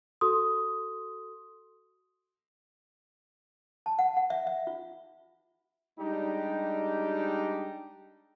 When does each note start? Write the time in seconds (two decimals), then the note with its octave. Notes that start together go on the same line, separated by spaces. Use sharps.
0.21 F#4 A4 C6 D#6
3.86 A5
3.99 F#5
4.17 F#5
4.30 E5
4.47 E5
4.67 F4
5.99 G3 G#3 D4 D#4 G4